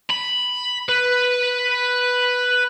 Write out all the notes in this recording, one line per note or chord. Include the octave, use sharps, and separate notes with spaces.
B5
B4